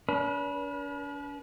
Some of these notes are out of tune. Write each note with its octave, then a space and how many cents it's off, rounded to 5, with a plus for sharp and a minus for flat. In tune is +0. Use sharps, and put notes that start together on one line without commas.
D4 -45 B4 -30